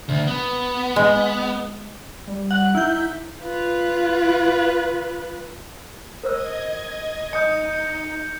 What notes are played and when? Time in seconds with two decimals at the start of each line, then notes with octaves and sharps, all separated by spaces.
0.09 D2
0.27 B3
0.96 G#3
2.27 G3
2.51 F#5
2.75 D#4 E4 G6
3.43 F4 B4
6.23 A#4 C5 D#5 E6 G#6
7.33 D#4 D#5 G#5 D#6 G6 C#7